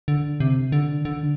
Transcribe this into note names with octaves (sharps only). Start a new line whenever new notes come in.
D3
C3
D3
D3